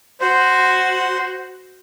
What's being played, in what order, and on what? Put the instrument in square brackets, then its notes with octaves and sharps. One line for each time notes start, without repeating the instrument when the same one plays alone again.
[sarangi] F#4 [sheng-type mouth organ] C5